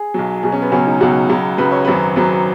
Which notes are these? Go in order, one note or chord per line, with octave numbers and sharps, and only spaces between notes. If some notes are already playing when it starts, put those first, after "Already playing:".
Already playing: G#4
B1 B2 F#3
B1 B2 F#3 G#4
C#4
B3
C#2 B2 F#3 C#4
D#4
C#2 B2 F#3 F#4
C#2 C#3 F#3
C#2 C#3 F#3 B4
C#5
G#1 F#2 F#3 B4
G#1 F#2 F#3 B4